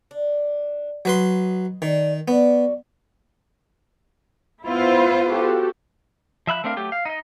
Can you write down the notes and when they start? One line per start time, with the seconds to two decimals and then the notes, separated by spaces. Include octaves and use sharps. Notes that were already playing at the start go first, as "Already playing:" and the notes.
0.11 D4
1.05 F#3 B4 D#5 C6
1.82 D#3 A3 D5
2.28 B3 F#4 D5
4.66 B3 E4 F4 C5
5.27 F#4 G4 A4
6.47 F3 E5 B5 F#6
6.64 A3 C4 D4 A#4 F5
6.76 F#3 A3 G4
6.92 F5
7.05 D#4 D#5